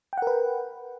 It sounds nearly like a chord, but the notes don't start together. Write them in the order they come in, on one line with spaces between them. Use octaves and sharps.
G5 F#5 A#4 B4